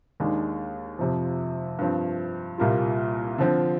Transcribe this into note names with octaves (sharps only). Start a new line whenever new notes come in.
D#2 D#3 G#3 D4
F2 C3 F3
G2 F3 C4
C2 A#2 G3 A#3 F4
D3 F3 C4